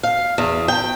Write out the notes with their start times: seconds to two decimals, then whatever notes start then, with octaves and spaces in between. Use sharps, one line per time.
0.03 F5
0.38 E2
0.68 G5